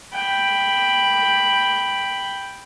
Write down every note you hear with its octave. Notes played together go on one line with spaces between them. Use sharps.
G5 B5